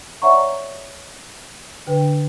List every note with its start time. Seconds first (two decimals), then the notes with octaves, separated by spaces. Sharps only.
0.22 C#5 D5 E5 F#5 A#5 C#6
1.87 D3 D4 B4 G5